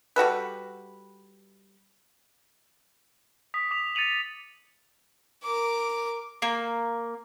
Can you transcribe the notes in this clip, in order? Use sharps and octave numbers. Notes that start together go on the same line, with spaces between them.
G3 F#4 A4 B4
D#6 B6
D6 B6 F7
A6 C#7 D#7 F7 F#7
A#4 D6
A#3